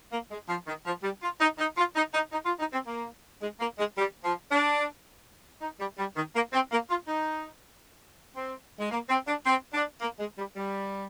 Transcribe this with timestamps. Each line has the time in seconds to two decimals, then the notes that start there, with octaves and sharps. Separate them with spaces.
0.12 A#3
0.31 G#3
0.49 F3
0.67 D#3
0.86 F3
1.04 G3
1.22 F4
1.40 D#4
1.58 D#4
1.77 F4
1.95 D#4
2.14 D#4
2.32 D#4
2.45 F4
2.59 D#4
2.73 C4
2.87 A#3
3.42 G#3
3.60 A#3
3.78 G#3
3.97 G3
4.24 F3
4.51 D4
5.61 D#4
5.80 G3
5.98 G3
6.16 D#3
6.35 A#3
6.53 C4
6.72 A#3
6.90 F4
7.08 D#4
8.36 C4
8.79 G#3
8.91 A#3
9.09 C4
9.27 D4
9.46 C4
9.73 D4
10.01 A#3
10.19 G#3
10.38 G3
10.56 G3